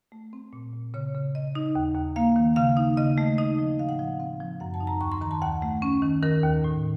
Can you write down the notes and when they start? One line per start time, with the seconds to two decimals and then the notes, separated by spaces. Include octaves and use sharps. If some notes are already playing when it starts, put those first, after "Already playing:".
0.12 A3
0.33 C4
0.53 A#2
0.73 A#2
0.94 C#3 C#5
1.15 C#3
1.35 C#3 D#5
1.55 D#4
1.76 D#2
1.95 D#2
2.16 A#3 F5
2.36 D#3
2.56 C#3 F5
2.77 D#4
2.97 C#3 D#5
3.18 A3
3.38 D#4 D#5
3.58 F3
3.79 A2 F5
3.89 F#5
3.99 F3 F5
4.20 C4 F5
4.41 F3
4.60 F#2 F#5
4.74 A5
4.80 D#4
4.87 A#5
5.01 D#2 C#6
5.12 C6
5.21 D#3 A#5
5.31 A5
5.42 D#2 F#5
5.62 A3
5.82 C#4
6.02 D#3
6.23 D#3 A#4
6.44 D#2
6.64 A2